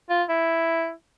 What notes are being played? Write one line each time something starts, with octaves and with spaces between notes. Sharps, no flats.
F4
E4